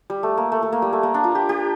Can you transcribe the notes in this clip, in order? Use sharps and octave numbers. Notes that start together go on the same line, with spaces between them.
G3
A3
A#3
A3
A3
A#3
G3
A3
A#3
D4
F4
G4
G4